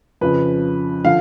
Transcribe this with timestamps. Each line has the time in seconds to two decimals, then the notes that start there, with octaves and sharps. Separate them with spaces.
0.21 F2 C#3 F3 B4
1.05 D3 F3 F5